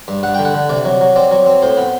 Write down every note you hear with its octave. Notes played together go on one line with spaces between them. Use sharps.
G2
G2 F#5
D3 G5
F#5
D3
C3 D5
F#3
F#3
C4 D5
F#3
C4
A2 C5
B3